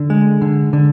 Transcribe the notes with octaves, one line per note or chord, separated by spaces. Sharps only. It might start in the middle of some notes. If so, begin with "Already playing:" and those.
Already playing: D3
G#3
D3
D3